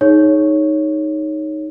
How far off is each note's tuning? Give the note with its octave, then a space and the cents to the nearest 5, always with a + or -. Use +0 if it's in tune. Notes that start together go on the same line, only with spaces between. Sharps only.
D#4 +0 G#4 +10 C#5 +0